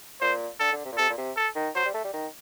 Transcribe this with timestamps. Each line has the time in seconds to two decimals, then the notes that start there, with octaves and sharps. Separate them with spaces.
0.21 A#2 C5
0.60 D3 A4
0.72 D3
0.85 C3
0.92 A#2
0.97 C3 A4
1.09 A#2
1.18 C3
1.37 A4
1.55 D#3
1.75 F#3 C5
1.85 G3
1.94 A3
2.04 G3
2.13 D#3